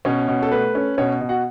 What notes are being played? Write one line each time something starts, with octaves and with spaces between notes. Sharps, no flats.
B2 C#4 C#5
B2
A4
A3 B4
C#4
B2 C#4 C#5
B2
F#4 F#5